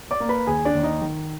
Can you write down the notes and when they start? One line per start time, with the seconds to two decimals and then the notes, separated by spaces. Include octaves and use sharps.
0.11 D5 D6
0.20 A#3
0.29 B4 B5
0.47 D#2 G#4 G#5
0.65 D4 D5
0.75 D#2
0.83 D#4 D#5
1.02 D#3